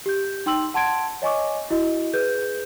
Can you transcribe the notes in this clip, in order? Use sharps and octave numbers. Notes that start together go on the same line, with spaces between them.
G4 G6
D#4 G5 C6 E6 F#7
F#5 A5 C6 G#6 D7
C#5 D#5 G#5 C#6 D6
E4 F#4 D#5
G#4 B4 G6